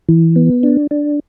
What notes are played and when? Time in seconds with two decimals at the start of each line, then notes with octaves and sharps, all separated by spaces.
0.09 E3
0.36 B3
0.63 D4
0.91 D4